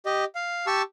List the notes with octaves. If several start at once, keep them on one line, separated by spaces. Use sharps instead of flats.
G4 D#5
F5
G4 A5 C#6 E6